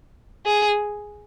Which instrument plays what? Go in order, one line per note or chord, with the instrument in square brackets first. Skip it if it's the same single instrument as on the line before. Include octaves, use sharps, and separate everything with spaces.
[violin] G#4